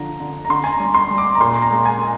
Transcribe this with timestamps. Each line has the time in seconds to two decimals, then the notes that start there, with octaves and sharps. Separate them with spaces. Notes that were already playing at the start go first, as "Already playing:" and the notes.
Already playing: D3 F3 A#5
0.20 D3
0.45 A#5
0.50 D3 C6
0.64 G#5
0.73 A#5
0.80 G3
0.94 C6
1.11 G3
1.18 D6
1.35 A#5
1.40 A#2 C6
1.62 A#5
1.71 G#3
1.85 G#5
2.01 G#3